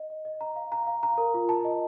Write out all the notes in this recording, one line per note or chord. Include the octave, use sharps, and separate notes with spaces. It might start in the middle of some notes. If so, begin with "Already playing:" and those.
Already playing: D#5
D#5
D#5
A#5
F5
A#5
F5
A#5
A#4
F4
A5
D#5